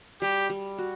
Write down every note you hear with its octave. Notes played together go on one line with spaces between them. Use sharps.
G3 G4
G3
F#4